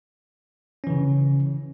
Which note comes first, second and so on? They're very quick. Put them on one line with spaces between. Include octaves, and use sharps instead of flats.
C#4 E3 C#3